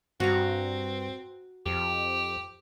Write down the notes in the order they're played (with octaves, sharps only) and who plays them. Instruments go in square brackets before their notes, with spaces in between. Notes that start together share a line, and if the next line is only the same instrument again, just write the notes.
[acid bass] G2 [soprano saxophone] C4 [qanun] F#4 A#5
[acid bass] F2 [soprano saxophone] G4